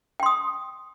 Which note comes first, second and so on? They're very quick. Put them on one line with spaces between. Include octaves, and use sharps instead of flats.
G5 C6 D#6